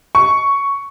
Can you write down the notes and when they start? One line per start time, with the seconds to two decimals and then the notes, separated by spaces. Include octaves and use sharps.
0.15 C#6